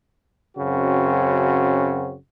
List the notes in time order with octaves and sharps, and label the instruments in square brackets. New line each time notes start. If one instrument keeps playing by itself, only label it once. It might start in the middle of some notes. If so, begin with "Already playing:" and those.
[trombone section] F#2 C#3 C4 F#4